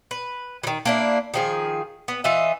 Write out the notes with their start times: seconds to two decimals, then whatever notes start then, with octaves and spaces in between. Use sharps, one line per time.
0.11 B4
0.63 D#3 E3
0.85 A#3 D4 E4
1.34 D#3 F3 G#4
2.08 B3
2.24 E3 F4 D#5 E5